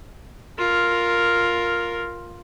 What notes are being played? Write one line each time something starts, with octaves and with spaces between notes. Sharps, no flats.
F4 A#4